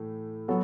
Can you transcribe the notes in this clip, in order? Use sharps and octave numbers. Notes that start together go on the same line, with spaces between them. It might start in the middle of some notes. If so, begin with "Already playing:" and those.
Already playing: A2 E3 A3
F#3 B3 F#4 A4